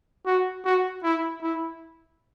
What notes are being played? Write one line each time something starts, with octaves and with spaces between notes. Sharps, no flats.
F#4
F#4
E4
E4